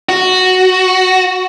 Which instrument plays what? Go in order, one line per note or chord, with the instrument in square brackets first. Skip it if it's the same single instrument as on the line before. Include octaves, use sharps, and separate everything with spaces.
[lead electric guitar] F#4